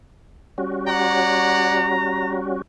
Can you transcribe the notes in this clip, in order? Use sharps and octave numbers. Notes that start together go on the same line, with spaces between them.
G3 C#4 F#4
C#5 D5 F#5 A#5